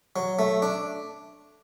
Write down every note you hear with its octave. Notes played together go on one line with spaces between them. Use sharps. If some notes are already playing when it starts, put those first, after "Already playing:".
F#3
A3
D4